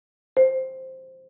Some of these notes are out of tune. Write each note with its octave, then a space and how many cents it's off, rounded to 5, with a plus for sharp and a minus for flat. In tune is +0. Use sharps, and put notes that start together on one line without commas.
C5 +0